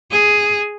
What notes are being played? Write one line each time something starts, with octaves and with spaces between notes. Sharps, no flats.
G#4